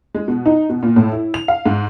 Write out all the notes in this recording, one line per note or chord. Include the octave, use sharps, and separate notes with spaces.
G#3
B2
D#4
B2
A#2
A2
E4
F7
F5
G#2